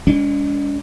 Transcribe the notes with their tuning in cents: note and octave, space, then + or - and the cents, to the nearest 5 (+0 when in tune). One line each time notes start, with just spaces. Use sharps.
G#3 -30 C#4 +45